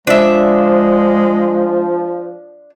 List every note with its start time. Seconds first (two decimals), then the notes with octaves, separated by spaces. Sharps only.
0.07 F3 G#3 D4 E5